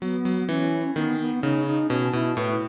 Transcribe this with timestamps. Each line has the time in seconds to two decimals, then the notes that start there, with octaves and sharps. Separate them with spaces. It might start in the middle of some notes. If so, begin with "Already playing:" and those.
0.01 F#3 B3
0.25 F#3
0.49 E3 C#4
0.96 D#3 B3
1.19 B3
1.43 C#3 D#4
1.66 D#4
1.90 B2 C#4
2.13 B2 E4
2.37 A2 B4